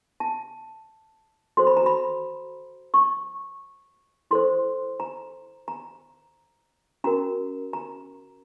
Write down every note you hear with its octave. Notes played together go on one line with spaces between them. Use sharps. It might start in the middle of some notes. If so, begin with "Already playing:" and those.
A5
F#4 A4 C5 C6
B5
A#5
B5
C#6
E4 A4 C5 C6
A#5
A#5
C#4 F#4 A#4 A#5
A#5